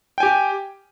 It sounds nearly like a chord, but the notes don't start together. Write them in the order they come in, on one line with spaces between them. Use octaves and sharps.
G5 G#5 G4